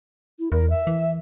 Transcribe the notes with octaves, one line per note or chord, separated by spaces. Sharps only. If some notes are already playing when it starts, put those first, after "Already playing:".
E4
E2 A#4
E5
E3